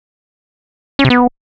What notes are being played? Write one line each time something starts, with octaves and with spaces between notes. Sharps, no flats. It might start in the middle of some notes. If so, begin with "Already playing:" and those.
C#4
C3
B3